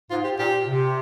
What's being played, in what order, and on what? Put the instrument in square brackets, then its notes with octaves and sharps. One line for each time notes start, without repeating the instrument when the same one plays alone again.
[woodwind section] G#2 [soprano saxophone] F4
[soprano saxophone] G4
[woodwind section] A#2 [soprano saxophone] G4
[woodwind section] C3